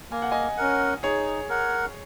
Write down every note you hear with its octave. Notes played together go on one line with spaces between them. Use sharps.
A#3 G#5
F#5
D#5 G#5
C#4 A#4 F#5
D#4 G#4 C#5
A#4 F#5